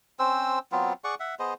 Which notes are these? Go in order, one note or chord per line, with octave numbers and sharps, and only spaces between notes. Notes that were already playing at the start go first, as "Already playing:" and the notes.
C4 C#4 C5 E6
F#3 B3 C4 F4
G#4 D5 F#5 C#6
E5 F#5
B3 G#4 C5 D#5